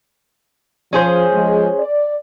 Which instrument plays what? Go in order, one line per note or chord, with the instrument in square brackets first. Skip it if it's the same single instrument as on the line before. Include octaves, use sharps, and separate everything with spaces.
[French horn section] F3 [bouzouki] C#4 G#4 C5
[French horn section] F3 G#3
D5